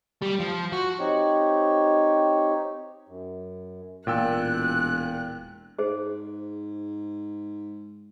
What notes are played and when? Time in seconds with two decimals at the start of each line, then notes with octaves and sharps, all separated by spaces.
0.22 G3
0.40 F3
0.72 F#4
0.99 C4 D#4 G4 C#5
3.09 F#2
4.07 E1 A#2 G5 E6 F#6
5.79 G#2 G#4 C5